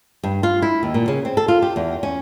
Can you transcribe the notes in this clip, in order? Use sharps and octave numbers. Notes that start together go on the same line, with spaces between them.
G2
F4
E4
D#2
A#2
C#3
C4
A4
F4
G4
E2
C#4